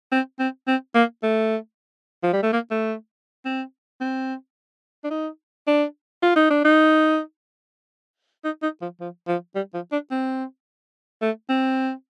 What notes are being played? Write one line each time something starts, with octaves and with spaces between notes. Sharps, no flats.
C4
C4
C4
A#3
A3
F3
G3
A3
A#3
A3
C4
C4
D4
D#4
D4
F4
D#4
D4
D#4
D#4
D#4
F3
F3
F3
G3
F3
D4
C4
A3
C4